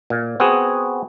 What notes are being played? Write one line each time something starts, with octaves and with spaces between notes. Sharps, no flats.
A#2
B3 C4 F#4 G#4